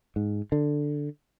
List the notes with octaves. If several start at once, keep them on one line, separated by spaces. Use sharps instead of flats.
G#2
D3